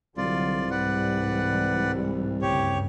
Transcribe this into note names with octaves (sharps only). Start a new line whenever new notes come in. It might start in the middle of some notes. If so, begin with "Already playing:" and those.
C2 D3 F#3 F4 D5
G#2 E3 G3 B4 D5 F#5
D2 G2 C#3 G4 C#5